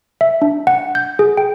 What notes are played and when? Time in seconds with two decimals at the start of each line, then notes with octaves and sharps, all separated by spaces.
0.21 E5
0.42 D4
0.67 F#5
0.95 G6
1.19 G#4
1.37 G5